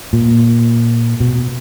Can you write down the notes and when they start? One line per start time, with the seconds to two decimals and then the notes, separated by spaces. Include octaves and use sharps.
0.13 A#2
1.20 B2